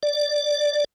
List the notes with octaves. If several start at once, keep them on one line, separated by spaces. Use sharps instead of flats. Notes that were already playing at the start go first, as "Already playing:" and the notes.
D5